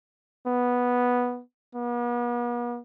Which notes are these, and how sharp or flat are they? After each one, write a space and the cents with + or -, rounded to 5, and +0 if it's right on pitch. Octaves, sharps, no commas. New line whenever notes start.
B3 -5
B3 -45